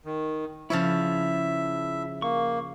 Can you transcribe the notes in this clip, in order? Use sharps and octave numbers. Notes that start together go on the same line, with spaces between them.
D#3
C#3 F3 E4 C#5 E5 A5
A#3 C#6